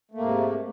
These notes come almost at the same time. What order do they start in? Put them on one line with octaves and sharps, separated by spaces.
A3 A#3 G#2 C3